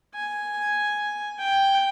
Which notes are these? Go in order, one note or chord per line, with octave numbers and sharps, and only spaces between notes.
G#5
G5